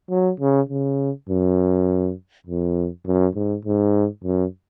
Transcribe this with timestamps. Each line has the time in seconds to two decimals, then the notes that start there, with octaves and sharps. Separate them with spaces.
0.10 F#3
0.40 C#3
0.70 C#3
1.29 F#2
2.47 F2
3.06 F#2
3.35 G#2
3.65 G#2
4.24 F#2